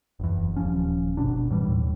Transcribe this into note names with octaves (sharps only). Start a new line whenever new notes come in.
F#1 E2
D#1 D#2 F3 C#4
G1 C#2 B2 D4
A2 E3 G3
D#2 A2